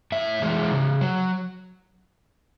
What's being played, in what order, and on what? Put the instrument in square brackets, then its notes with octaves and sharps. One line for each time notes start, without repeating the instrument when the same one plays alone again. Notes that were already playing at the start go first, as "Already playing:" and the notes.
[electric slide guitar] A2 E5
E3 G#3
C#3
F#3